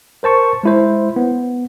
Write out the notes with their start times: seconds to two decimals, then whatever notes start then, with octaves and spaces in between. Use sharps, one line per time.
0.23 A#4 C5 A5 C#6
0.63 G#3 E4 C5
1.16 B3